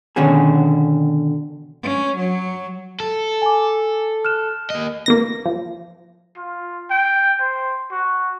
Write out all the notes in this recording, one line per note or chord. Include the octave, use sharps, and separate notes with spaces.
B2 D3 D#3 C#4 F#4 G#4
C#4
F#3
A4
G#5 D6
F6 F#6 E7
A#3 D#5
A#3 B3 A#6
F3
F4
G5
C5
F#4